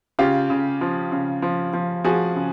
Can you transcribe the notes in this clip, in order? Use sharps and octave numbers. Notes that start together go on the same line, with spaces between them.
C#3 F4 G4
C#3
F3
C#3
F3
F3
F3 F#4 G#4
C#3